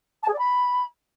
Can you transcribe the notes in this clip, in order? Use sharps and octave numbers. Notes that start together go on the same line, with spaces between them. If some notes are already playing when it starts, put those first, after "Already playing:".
A5
G#4
D5
B5